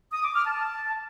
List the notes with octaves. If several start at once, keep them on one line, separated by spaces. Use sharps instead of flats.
D#6
D6
F6
A5